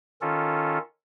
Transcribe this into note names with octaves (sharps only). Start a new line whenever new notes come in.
D#3 C#4 F4 A4